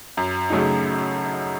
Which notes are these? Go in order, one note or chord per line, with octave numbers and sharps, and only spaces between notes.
F#2
C#3 F#3 A3 D#4